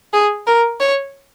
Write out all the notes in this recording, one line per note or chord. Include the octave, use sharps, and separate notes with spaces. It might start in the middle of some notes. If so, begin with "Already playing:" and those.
G#4
A#4
C#5